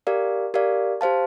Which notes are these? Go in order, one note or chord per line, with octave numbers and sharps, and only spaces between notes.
G4 A#4 D5 F5
G4 A#4 D5 F5
G4 C5 F5 A5